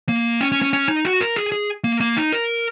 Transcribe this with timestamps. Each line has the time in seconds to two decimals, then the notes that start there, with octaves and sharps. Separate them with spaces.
0.09 A#3
0.41 C#4
0.52 C#4
0.62 C#4
0.73 C#4
0.89 D#4
1.05 F#4
1.21 A#4
1.36 G#4
1.52 G#4
1.84 A#3
2.01 A#3
2.17 D#4
2.32 A#4